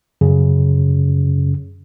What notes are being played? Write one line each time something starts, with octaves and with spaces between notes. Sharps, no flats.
F#2 C#3